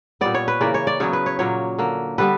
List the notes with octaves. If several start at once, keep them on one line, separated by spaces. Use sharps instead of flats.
A#2 G3 B3 D5
C#5
B4
C#3 E3 A#3 D5
C#5
D5
C#3 F#3 B3 C#5
B4
C#5
A#2 F#3 A#3 C#5
D3 A#3
D3 G3 B3 B4